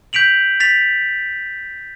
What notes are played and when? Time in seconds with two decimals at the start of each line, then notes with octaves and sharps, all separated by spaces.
0.13 G6 B6 D7 F7 F#7
0.60 A6 B6 F7